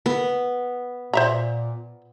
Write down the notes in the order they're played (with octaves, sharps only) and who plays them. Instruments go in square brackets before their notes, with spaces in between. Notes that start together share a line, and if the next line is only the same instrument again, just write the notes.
[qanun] B3
[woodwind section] A#2 [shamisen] C5 E5 A#5